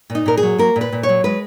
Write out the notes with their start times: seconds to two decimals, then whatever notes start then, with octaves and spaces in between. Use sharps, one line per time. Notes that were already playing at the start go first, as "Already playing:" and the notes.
0.10 A#2
0.15 D#4
0.26 A#2 A#4
0.38 G#4
0.43 F#3
0.58 A#3 A#4
0.76 A#2
0.81 B4
0.92 A#2
1.03 C#5
1.09 F#3
1.24 G#3 B4